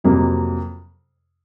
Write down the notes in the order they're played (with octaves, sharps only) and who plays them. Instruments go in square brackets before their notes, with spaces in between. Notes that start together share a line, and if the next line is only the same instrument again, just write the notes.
[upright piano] F2 C3 F#3 A#3